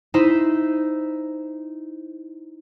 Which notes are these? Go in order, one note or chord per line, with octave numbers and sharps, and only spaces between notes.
D#4 E4 C5 E5